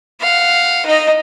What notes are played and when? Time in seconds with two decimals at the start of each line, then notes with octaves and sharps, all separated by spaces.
0.21 F5 F#5
0.86 D#4 D#5